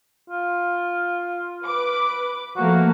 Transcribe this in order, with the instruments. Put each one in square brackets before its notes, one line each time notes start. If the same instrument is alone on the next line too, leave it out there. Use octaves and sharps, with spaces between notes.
[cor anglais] F4
[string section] B4 D6
[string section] F3 A3 A#3 [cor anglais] F#4